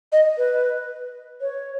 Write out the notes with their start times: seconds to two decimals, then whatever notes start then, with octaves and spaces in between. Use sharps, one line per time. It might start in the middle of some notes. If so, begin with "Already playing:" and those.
0.12 D#5
0.38 B4
1.41 C#5